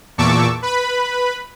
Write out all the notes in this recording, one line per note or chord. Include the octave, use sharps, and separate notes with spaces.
E2 A#2 A5 C#6 D6 E6
B4 B5